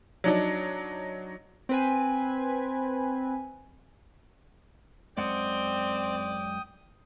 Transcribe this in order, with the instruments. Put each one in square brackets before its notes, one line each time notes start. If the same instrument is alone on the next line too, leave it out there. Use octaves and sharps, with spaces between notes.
[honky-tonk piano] F#3 D4 D#4
[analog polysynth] C4 B4 G#5
[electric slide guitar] F#2 G#3 F#5 [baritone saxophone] C4 [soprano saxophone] D5 [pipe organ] G5 D#6